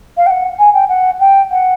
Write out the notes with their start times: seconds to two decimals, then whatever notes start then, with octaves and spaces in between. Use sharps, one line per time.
0.17 F5
0.26 G5
0.30 F#5
0.59 G#5
0.74 G5
0.89 F#5
1.20 G5
1.51 F#5